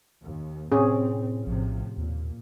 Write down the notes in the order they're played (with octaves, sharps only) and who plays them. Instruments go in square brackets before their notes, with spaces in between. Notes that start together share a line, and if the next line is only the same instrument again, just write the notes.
[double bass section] D#2
[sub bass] A2 [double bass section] C3 C4 [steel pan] C#4 G#4
[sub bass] A#1 [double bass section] A2 C3 F3
[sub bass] D#2 [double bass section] A#2